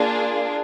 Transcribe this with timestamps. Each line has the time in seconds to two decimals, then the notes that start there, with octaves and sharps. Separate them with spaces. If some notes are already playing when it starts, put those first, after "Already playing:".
Already playing: A#3 D4 F4 G#4